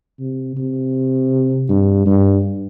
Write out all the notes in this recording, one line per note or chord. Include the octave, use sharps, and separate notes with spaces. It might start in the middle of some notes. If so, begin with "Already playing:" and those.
C3
C3
G2
G2